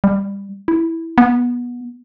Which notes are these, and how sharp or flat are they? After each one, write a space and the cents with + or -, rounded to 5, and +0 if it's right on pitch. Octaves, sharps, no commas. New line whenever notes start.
G3 +20
E4 -5
B3 -20